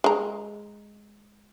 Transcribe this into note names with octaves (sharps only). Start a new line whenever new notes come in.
G#3 A#5